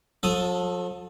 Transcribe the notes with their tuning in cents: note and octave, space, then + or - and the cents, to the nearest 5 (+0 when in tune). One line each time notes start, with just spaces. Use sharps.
F3 +45 A4 +0 D#6 +0